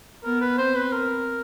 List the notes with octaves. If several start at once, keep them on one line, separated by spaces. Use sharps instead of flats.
B3 A#4
B4
C4 C5
B4
A#4